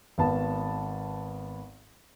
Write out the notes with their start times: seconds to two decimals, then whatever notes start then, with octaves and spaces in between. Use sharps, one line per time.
0.18 G#1 B3 A5